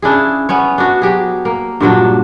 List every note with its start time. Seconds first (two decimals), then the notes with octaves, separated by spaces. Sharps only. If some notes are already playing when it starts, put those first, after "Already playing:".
0.02 C#3 D4 E4 G#4
0.49 B3 C#4 C#5
0.78 D4 F#4
1.02 F#3 G4 G#4
1.45 A#3
1.80 G2 A#2 F#3 D4